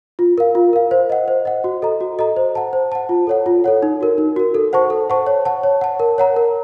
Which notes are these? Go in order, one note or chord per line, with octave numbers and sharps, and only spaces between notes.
F4
A#4 F5
F4
A#4 F5
C5
D#5 F#5
C5
D#5 F#5
F#4
A4 D#5 A#5
F#4
A4 D#5 A#5
C5
F#5 A5
C5
F#5 A5
F4
A4 C#5 F#5
F4
A4 C#5 F#5
D#4
F#4 A#4
D#4
F#4 A#4
A4
C5 F#5 A5 C#6
A4
C5 F#5 A5 C#6
C#5
F#5 A5
C#5
F#5 A5
A#4
C#5 F#5 A#5
A#4